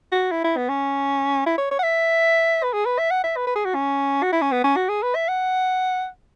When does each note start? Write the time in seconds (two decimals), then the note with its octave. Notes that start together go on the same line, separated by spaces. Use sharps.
0.12 F#4
0.32 E4
0.44 E4
0.57 B3
0.69 C#4
1.46 E4
1.58 C#5
1.71 C#5
1.79 F#5
1.83 E5
2.63 B4
2.73 G#4
2.86 B4
2.99 E5
3.11 F#5
3.24 E5
3.37 B4
3.47 B4
3.56 G#4
3.65 F#4
3.75 C#4
4.23 F#4
4.32 E4
4.42 C#4
4.52 B3
4.64 C#4
4.77 F#4
4.89 G#4
5.03 B4
5.15 E5
5.28 F#5